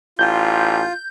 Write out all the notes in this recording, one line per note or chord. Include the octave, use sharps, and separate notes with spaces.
A1 F4 G6